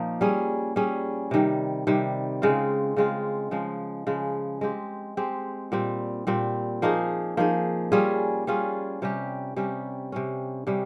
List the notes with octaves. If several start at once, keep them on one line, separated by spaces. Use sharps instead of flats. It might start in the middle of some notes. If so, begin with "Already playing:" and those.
Already playing: A#2 F3 A#3 D#4
G3 C#4 G#4
G3 C#4 G#4
C3 D#3 G3
C3 D#3 G3
C#3 G#3 C4 F4
C#3 G#3 C4 F4
C#3 F3 G#3
C#3 F3 G#3
G#3 C4 G4
G#3 C4 G4
A#2 G3 C4
A#2 G3 C4
F3 A#3 D#4 G#4
F3 A#3 D#4 G#4
G3 C#4 F4 G#4
G3 C#4 F4 G#4
C3 G3 C#4 G4
C3 G3 C#4 G4
C3 G3 C#4
C3 G3 C#4